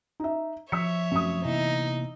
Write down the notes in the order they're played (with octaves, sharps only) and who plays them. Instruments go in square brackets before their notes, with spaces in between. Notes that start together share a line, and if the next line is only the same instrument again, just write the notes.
[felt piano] D#4 E5
[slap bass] F3 [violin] C#5 E5 [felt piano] E6 B6 C#7
[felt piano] F#2 D#6 [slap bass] F3 A3 C4
[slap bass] C3 A#3 B3 [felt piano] E3 [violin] D#4